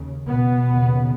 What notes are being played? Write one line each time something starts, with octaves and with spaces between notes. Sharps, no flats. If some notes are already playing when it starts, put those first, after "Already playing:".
Already playing: D#2 C#3
B2 B3
D#2 C#3